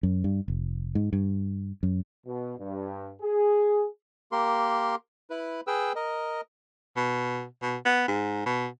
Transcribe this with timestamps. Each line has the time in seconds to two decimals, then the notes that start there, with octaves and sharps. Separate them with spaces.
0.03 F#2
0.24 G2
0.48 F1
0.95 G#2
1.13 G2
1.83 F#2
2.27 B2
2.59 G2
3.22 G#4
4.32 A#3 G4 A#4 C6
5.30 E4 B4
5.67 G#4 B4 G5 E6
5.96 A#4 D#5
6.96 B2
7.62 B2
7.85 B3
8.08 G#2
8.46 B2